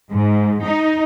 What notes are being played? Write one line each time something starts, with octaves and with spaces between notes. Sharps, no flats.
G#2
D#4